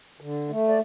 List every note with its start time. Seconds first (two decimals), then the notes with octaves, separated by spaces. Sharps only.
0.21 D3
0.49 A3
0.69 D5